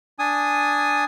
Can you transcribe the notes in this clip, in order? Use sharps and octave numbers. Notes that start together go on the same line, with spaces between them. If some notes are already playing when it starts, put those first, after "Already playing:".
D4 G#5 D#6